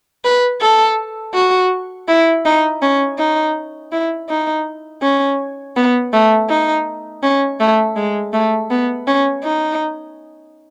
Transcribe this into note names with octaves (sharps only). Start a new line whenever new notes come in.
B4
A4
F#4
E4
D#4
C#4
D#4
E4
D#4
C#4
B3
A3
D#4
C#4
A3
G#3
A3
B3
C#4
D#4